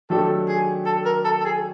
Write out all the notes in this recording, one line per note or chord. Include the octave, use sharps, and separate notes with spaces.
D#3 F#3 A3 D4 G4 A4
G#4
A4
A#4
A4
A4
G#4